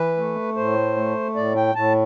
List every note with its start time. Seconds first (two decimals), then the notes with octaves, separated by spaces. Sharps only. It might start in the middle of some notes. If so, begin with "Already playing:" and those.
Already playing: E3 B4
0.17 A3
0.57 A2 C5
0.97 A3
1.35 A2 D5
1.56 G5
1.75 A2 A5